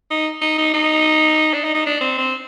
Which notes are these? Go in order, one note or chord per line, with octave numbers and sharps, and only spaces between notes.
D#4
D#4
D#4
D#4
D4
D#4
D#4
D4
C4
C4